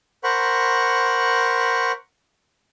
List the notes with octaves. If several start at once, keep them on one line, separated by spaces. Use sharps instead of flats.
A#4 C5 F#5 B5 C#6